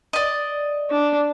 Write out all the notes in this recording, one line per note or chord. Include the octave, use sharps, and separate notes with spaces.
D5 D#5
D4